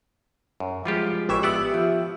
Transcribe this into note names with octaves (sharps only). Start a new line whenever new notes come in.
F#2
F3 G3 G#3 F4 G4
A1 E3 G4 C#5 E5 E6
B3 G4 D5 E5 F#5
F3